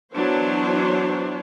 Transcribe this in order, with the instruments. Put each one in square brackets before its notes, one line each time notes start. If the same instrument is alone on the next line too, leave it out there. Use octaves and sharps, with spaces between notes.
[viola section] E3 F#3 B3 D4 C5 C#5